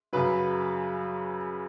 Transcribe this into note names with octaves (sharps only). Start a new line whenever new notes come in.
F#2 C#3 F#3 B4